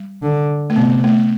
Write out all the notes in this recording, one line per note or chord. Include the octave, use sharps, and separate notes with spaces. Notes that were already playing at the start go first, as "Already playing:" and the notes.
Already playing: G3
D3
A3
C3 B3
A3